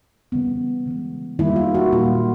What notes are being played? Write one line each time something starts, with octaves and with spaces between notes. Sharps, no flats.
C#3 E3 G3 B3
C#3 E3 G#3
D#3 G3 A#3 E4
F4
F#4
A#2 G3 A#3 F4